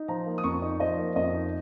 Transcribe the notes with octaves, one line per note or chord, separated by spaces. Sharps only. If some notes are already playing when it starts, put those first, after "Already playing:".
Already playing: D#4
F3 A#5
A#3
D#6
F2 C#6
D#4
F3 D#5
A#3
F2 D#5
D#4